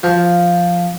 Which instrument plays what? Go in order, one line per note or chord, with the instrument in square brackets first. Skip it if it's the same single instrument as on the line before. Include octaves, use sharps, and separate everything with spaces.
[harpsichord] F3